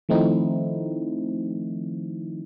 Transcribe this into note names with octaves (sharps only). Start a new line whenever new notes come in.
D#3 F3 A3 C4 D#4 E4